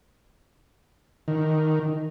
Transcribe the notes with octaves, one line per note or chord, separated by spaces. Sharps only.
D#3